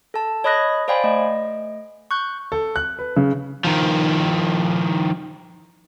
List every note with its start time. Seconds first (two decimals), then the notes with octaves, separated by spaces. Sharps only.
0.14 A4 A5
0.44 C#5 D#5 B5 D#6 F#6 A#6
0.88 C5 D5 F5 G5 G#5 B5
1.04 A3 D#5
2.11 C#6 F#6 G6
2.52 A4
2.76 F#6
2.99 B4
3.16 C#3
3.64 D#3 F3